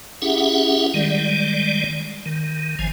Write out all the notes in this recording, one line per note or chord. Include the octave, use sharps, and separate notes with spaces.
C#4 E4 G4 G#4 E5 F#5
D#3 G3 G#3 D5
D#3
A1 F3 G#5